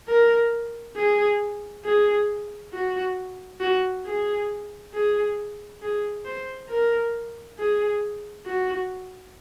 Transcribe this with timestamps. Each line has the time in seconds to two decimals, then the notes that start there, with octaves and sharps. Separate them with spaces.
0.08 A#4
0.96 G#4
1.85 G#4
2.73 F#4
3.61 F#4
4.06 G#4
4.94 G#4
5.82 G#4
6.25 C5
6.69 A#4
7.59 G#4
8.46 F#4